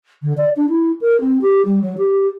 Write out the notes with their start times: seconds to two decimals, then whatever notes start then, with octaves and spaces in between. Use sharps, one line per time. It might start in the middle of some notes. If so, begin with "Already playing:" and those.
0.22 D3
0.37 D5
0.56 D4
0.69 E4
1.01 A#4
1.20 C4
1.41 G4
1.65 G3
1.81 F#3
1.97 G4